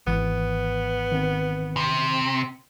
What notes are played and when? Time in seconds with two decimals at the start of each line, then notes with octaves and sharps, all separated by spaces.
0.07 G#1 E3 B3
1.12 D#3 C4
1.77 C3